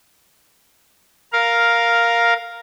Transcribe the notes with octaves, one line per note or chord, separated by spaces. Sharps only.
A#4 F5